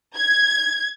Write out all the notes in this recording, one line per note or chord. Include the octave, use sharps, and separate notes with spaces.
G#6